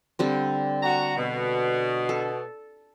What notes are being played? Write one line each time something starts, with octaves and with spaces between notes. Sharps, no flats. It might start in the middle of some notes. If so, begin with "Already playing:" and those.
D3 G3 C4
F#4 A#5
B2
A4